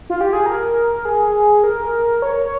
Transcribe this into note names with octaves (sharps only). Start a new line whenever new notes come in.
F4
G4
G#4
A#4
G#4
A#4
C#5